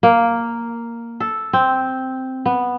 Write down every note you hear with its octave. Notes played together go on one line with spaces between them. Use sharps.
A#3
A4
C4
B3